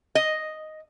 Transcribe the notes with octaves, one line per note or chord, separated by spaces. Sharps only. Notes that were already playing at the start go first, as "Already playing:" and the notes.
D#5